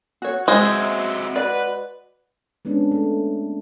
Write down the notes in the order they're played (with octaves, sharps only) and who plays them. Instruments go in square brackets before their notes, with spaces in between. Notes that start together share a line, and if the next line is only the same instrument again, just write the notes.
[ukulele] F#4 C#5
[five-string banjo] G#3 [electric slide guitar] C4 F#4 E5 [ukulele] C5
[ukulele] F#4 D5 [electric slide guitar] B4
[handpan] G#3 B3 C#4 D4
A3